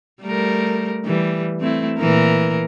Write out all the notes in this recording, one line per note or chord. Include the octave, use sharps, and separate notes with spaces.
G3 A3 A#4
E3 G3
A3 C4 E4
A#2 E3 A#4